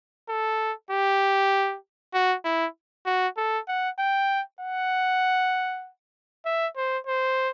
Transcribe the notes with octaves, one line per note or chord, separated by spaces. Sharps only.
A4
G4
F#4
E4
F#4
A4
F#5
G5
F#5
E5
C5
C5